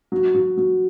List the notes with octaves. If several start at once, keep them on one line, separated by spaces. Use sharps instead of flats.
F#3
F#3
F#3